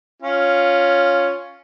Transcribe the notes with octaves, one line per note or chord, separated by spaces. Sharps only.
C#4 F4